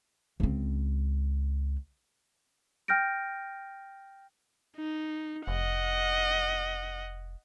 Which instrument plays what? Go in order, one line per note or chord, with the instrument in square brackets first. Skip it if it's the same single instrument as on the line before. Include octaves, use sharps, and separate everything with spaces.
[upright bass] C#2 C4
[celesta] G5 F6 G6 A#6 D7
[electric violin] D#4
[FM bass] F1 [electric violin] D#5 F#5